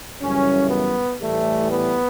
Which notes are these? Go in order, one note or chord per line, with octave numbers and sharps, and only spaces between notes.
F#2 C#3 E3 G3 C#4
B3
A2 E3 G3 A3
B3